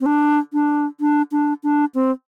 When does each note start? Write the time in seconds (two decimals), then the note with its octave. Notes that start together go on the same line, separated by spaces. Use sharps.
0.01 C4
0.06 D4
0.53 D4
1.00 D4
1.32 D4
1.63 D4
1.95 C4